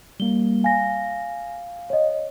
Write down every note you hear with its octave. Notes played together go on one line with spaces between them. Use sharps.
G3 A#3 G7
F5 G#5 A#6
C#5 D#5